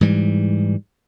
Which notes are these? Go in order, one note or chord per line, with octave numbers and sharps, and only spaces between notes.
G#2 E3 G3